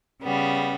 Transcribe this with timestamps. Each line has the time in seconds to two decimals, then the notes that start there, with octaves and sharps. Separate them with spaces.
0.22 C#3 G3 B3